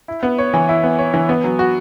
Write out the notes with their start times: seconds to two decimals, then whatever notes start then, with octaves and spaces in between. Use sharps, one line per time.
0.08 E4
0.23 B3
0.38 C#5
0.54 E3
0.69 E4
0.84 B3
0.98 C#5
1.14 E3
1.29 B3
1.44 F#3
1.59 F#4